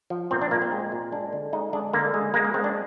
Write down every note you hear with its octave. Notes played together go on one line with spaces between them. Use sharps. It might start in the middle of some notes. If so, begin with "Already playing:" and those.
F3
A#2 C4
D4
A#2 A#3
C4
G#3
A#2
G#3 D4
D3
G#3 D#4
G#3 D4
D3 A#3
G#3
G#3 A#3
A#3
G#3 C4
D4